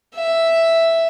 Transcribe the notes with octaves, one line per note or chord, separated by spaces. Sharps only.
E5